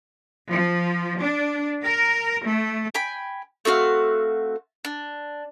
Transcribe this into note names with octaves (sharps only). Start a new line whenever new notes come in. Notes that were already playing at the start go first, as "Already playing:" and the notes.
F3
D4
A#4
A3
G5 G#5 B5
A3 C4 F#4 F5
D4